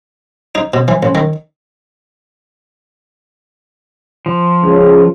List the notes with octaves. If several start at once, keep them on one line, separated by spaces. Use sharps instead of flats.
D#4
B2
E3
A1
D#3
F3
C#2